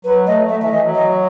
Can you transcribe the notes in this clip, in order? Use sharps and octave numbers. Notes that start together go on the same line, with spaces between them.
F#3 B4
A3 D#5
A3 E5
E3 E5
E3 D#5
F#3
D#5